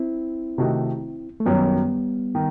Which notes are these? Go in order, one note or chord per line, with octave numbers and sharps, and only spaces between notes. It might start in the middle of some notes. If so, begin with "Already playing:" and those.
Already playing: C4 E4
C3 D#3 A3 D#4 F#4
A3
F#2 D#3 F#3 G3 B3
D#3